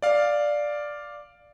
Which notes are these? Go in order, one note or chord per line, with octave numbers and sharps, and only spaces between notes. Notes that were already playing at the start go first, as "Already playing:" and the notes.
D5 F5